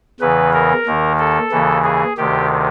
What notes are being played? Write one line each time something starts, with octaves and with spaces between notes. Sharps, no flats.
E2 C#3 E3 B4
A#4
D#2 D#3
A4
D#2 C#3 E3
G#4
D2 C3 D#3 G4